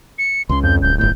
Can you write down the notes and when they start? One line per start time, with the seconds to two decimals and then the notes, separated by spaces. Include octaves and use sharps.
0.18 C#7
0.49 C#2 C#3 C6
0.63 F2 G6
0.82 D1 G6
0.99 G1 A2 G6